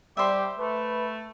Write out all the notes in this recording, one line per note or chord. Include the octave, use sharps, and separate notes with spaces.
G3 G4 C5 E5
A3 B4